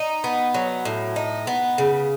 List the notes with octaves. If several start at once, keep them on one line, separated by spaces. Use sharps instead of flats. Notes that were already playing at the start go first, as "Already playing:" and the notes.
Already playing: D#4
B3
F#3
A2
D#4
B3
C#3